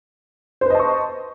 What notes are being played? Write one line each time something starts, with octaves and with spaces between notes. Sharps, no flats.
B4 C5 D#5 A5 C#6